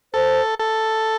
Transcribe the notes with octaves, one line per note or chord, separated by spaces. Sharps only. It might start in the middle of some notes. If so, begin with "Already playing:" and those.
A4 C5
A4